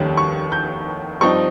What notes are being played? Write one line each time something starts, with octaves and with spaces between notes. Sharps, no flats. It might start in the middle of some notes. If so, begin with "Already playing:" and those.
Already playing: F1 D#2 D#3 G3 C#4
C#6
G6
G2 F3 C4 D#4 C#6